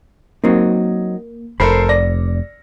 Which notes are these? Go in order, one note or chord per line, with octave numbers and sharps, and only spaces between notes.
F#3 A#3 C4 D#4
F1 A4 A#4 C5 B5 C7
D5 A#6